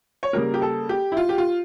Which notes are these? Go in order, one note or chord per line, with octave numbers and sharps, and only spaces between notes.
C#5
C#3 G3 A#3 A#4
G4
A4
G4
E4
F4
G4
F4